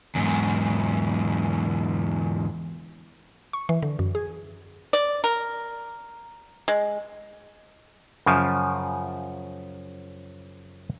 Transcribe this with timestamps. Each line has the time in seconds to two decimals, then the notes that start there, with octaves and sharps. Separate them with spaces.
0.15 E2 G#2
3.53 C#6
3.69 E3
3.83 D3
3.99 F#2
4.15 G#4
4.93 D5
5.24 A#4
6.68 G#3
8.26 F#2 C#3 F3